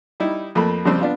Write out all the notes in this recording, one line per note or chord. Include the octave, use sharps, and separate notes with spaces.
G3 D#4 E4
F2 A3 A#3 B5
F2 C#3 F3 G3 C4
B3 D4 F4